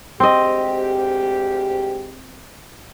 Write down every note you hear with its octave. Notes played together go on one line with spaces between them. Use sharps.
D2 G#2 C4 G4 D#5